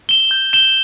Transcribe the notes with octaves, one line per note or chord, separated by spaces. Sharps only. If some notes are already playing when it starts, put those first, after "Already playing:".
E7 G7
G6
E7 G7